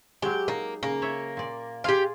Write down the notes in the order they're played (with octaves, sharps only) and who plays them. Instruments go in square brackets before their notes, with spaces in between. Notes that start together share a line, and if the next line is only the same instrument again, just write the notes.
[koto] F#3 G#3 [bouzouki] G4
[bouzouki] A#3 [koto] D#4
[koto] C#3 [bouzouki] A#3
[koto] C#5 E5
A#2 D5
[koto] F4 G#4 D5 [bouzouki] G4 F5